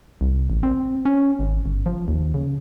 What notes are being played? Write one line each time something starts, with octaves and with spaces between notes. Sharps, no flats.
C2
A1
C4
C#4
G#1
G1
F3
D#2
C#3